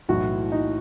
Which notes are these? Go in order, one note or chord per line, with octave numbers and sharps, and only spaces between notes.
B1 A2 E3 F#4
D#4